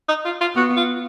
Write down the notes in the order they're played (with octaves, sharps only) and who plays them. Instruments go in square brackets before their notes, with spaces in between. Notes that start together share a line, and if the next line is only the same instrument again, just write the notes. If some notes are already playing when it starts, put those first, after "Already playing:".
[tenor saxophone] D#4
F4
F4
[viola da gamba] B3 [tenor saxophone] F#4
[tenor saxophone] F4